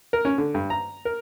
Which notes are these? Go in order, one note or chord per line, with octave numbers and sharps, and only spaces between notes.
A#4
C#4
D3
G2
A#5
A#4